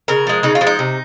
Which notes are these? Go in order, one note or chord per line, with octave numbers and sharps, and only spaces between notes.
C#3 A#4
F3 G#3
C#3 D#4
F4
F3 G#3
D#4
C3